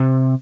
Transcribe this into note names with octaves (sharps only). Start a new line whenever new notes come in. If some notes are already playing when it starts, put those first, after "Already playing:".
Already playing: C3